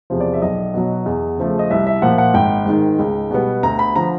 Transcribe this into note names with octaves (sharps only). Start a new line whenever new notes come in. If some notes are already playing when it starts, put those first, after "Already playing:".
E2 C3 F3
D5
E5
B1 D#5
B2 F#3
E2
C#3 F3 A3
D#5
C2 E5
E5
A#2 F3 A#3 F#5
F#5
G#1 G5
G#2 D#3
C#2
B2 G3 B3
D2 A#5
B5
D3 F3 A#5